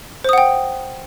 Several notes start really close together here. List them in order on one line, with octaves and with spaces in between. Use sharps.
C5 D#6 F#5 G5